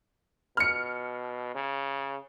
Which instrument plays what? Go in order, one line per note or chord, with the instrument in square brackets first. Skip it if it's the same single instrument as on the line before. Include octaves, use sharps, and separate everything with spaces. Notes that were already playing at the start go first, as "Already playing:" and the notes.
[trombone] B2 [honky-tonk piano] F6 C#7
[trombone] C#3